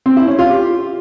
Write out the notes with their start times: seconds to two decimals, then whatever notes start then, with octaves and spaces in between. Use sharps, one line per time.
0.06 C4
0.17 E4
0.28 C#4
0.39 F4
0.50 G4